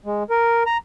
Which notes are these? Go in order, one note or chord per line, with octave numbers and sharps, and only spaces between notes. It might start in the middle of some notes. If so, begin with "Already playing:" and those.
G#3
A#4
A#5